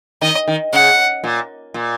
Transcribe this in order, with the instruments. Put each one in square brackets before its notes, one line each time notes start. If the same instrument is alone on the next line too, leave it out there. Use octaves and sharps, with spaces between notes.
[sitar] D#3 [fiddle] D#5
[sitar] D#3
[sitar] C#3 [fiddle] F#5
[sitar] A#2
A#2